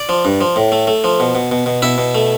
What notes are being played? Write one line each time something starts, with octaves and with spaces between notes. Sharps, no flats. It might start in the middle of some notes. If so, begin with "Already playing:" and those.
Already playing: D5
F3
G2
F3
A2
A3
A3
F3
B2
B2
B2
B2
B2 E4 E5
B2
A3